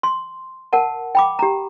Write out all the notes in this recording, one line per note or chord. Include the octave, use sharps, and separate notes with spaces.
C6
A#4 F#5 A5
G5 B5 D6
G4 A#5